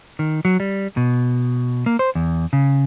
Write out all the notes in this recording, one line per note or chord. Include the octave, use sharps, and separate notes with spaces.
D#3
F#3
G3
B2
A#3
C5
E2
C#3